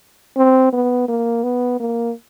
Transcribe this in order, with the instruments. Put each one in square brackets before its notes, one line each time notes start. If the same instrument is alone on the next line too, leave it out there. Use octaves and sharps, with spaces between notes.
[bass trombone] C4
B3
A#3
B3
A#3